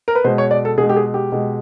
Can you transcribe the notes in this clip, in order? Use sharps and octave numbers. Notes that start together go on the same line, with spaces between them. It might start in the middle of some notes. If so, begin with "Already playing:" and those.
A#4
B4
B2 G#3 C5
C#5
D5
A4
B2 G#4
G#3
G4
G#4
G4
B2 G#3